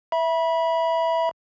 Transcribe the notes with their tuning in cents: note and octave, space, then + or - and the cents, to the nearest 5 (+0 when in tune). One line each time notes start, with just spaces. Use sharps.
E5 +0 B5 -30